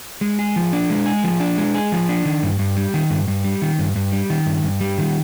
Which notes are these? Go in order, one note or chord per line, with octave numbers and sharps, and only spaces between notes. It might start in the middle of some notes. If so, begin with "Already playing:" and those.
G#3
G#4
F3
D4
G#3
G#4
F3
D4
G#3
G#4
F3
D4
D#3
G2
G2
G3
D#3
G2
G2
G3
D#3
G2
G2
G3
D#3
G2
G2
G3
D#3